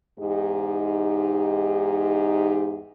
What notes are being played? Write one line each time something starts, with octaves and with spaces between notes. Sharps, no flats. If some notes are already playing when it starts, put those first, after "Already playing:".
E2 G#2 D#4 G4